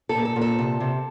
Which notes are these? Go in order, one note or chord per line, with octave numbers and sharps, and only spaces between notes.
A4
A#2
A4
A#2
A4
C3
C3